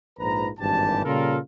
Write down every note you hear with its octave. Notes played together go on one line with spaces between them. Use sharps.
A#1 G#2 F3 B4 A#5
G#1 G2 A#2 E3 G4 A5
A#2 C#3 G3 F4 A4 A#4